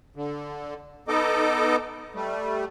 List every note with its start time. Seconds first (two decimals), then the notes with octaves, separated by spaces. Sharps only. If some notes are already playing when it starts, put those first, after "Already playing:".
0.16 D3
1.08 B3 D#4 A4 D#5 D6
2.15 G3 A3